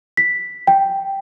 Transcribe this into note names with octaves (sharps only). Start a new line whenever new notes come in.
B6
G5